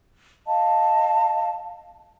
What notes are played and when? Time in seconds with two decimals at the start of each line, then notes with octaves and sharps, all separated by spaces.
0.47 D#5 F5 A5